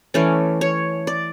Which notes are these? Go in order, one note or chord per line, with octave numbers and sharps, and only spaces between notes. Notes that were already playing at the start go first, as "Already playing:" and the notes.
E3 A3 C#4 D5
C#5
D5